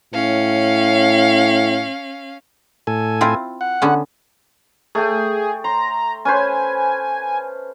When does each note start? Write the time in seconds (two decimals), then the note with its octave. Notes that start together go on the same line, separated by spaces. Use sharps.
0.14 A2 C#4 F5
2.87 A2 A4 G#5
3.21 C4 E4 F4
3.61 F#5
3.82 D3 B3 C#4
4.95 A3 G#4 G5
5.64 A#5 C6
6.25 C#4 B4 C5 G#5